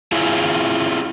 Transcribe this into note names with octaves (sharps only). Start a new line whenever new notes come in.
E4 F4 G#4